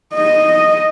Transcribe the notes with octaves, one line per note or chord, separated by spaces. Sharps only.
D#5